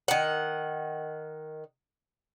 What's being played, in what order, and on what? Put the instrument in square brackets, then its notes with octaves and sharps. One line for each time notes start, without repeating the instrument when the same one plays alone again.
[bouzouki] D#3 F#5